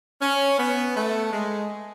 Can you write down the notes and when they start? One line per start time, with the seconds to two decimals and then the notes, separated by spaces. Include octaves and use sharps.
0.21 C#4
0.59 B3
0.96 A3
1.33 G#3